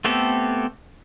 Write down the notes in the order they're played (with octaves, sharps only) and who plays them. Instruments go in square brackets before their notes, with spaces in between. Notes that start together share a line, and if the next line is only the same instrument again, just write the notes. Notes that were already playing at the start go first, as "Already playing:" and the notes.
[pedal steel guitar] A3 B3 C4 G4 A4